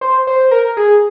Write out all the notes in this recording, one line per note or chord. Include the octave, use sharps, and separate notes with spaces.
C5
C5
A#4
G#4